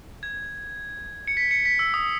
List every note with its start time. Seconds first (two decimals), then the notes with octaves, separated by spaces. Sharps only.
0.23 G#6
1.27 C#7
1.37 B6
1.51 C#7
1.65 B6
1.79 E6
1.94 D#6